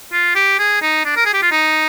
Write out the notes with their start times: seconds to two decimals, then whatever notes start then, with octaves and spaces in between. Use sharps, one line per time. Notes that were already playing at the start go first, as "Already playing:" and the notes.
0.12 F4
0.35 G4
0.59 G#4
0.82 D#4
1.05 D4
1.16 A#4
1.26 G#4
1.33 G4
1.42 F4
1.51 D#4